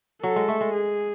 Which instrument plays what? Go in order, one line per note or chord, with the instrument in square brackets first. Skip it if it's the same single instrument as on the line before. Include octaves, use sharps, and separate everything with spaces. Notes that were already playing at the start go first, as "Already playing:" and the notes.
[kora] F#3 [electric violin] A4
[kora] G#3
A3
G#3
[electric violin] G#4